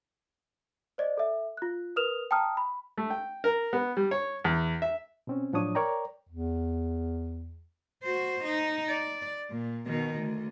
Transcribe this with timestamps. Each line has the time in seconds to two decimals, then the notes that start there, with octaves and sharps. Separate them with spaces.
0.98 C5 D5 D#5
1.17 A4 E5
1.57 F4 F#6
1.96 A#4 B4 D#6 F6 E7 F7
2.31 G5 A5 A#5 D#6 F6
2.57 B5
2.98 A3
3.10 G5
3.44 A#4
3.73 B3
3.97 G3
4.11 C#5
4.45 E2
4.82 E5
5.27 B2 C4 C#4
5.53 A2 F3 F#3 D4 C#5 D#6
5.75 A#4 C#5 D5 G5 A#5
6.29 E2
8.03 F#4 C5
8.44 D#4
8.89 D5
9.51 A#2
9.86 B2 D#3
10.18 D2